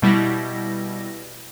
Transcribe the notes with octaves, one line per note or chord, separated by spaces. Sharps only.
B2 G3 E4 A#6